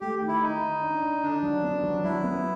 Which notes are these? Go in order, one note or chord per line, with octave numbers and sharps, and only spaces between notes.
A3 G4
D#3
E4
D#3 D#4
D#3
D4
D4
D3 D4
F#3
B3
F#3
F#3 E4
B3